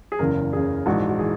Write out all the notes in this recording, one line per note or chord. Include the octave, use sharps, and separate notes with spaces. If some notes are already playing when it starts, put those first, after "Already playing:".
G#4
F#1 E2 C#3 A#4
F#1 E2 C#3 G#4
A#1 G#2 E3 G#3 F#4
F#4
E3 G#4